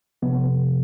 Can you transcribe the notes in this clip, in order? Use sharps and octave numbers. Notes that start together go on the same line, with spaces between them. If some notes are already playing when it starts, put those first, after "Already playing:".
C3 F3 B3